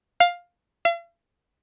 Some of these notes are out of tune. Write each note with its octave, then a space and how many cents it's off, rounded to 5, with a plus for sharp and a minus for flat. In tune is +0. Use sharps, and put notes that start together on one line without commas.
F5 +10
F5 -45